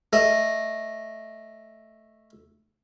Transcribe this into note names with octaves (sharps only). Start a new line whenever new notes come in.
A3 D#5